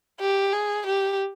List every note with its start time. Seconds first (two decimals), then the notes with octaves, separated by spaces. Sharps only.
0.20 G4
0.53 G#4
0.87 G4